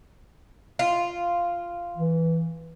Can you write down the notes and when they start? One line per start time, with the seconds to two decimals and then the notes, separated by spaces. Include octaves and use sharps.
0.79 F4
1.97 E3